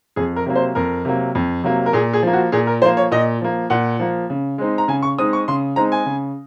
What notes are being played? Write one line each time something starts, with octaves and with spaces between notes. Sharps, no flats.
F2 G#4
A#4
C3 F#3 A#3
C5
F2 A#4
C3 F#3 A#3
F2
C3 F#3 A#3
A#4
A#2 G#4
G#4
F3 A#3
F#4
A#2 G#4
A#4
F3 A#3 C5
C#5
A#2 D#5
F3 A#3
A#2 F#5
F3 A#3
C#3
G#3 C4 D#4
A#5
C#3 G#5
C#6
G#3 C4 D#4 D#6
C#6
C#3 C6
G#3 C4 D#4 A#5
G#5
C#3